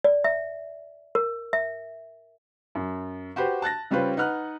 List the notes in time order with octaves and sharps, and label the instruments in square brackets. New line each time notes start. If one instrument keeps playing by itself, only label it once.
[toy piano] D5
E5
A#4
E5
[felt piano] F#2
F#4 G4 B4 C5
A5 F#6 A6 A#6
C#3 G3 C#4 F4 B4 C5
D#4 B4 F#5 F6 F#6